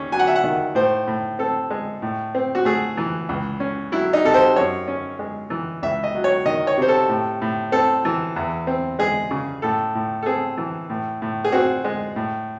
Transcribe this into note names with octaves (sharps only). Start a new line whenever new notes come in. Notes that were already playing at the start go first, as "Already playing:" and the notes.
Already playing: D#2 C#4
F#3 G#5
F#5
E5
F#5
D#3
A2 C5
A2
C4 A4
G#3
A2
C4
F#4
A3 G#4
E3
C#2
C#4
F#3 E4
D#4
C3 A4
C5
F#2 C#5
C#4
G#3
E3
C#2 E5
D#5
F#3
C#5
D#3 D#5
C#5
C3 C5
A4
A2
A2
C4 A4
E3
E2
C4
G#3 G#4
C#3
A2 A4
A2
A4
C4 G#4
E3
A2
A2
G#4
C4 F#4
G#3
A2